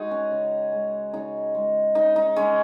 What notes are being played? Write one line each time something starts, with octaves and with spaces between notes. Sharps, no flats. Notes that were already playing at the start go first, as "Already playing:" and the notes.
Already playing: G#3 D#4 F#4 G#4
C#4
C#3
G#3
C#3 D#4
G#3
C#3 D#4
D#4
G#3 C#4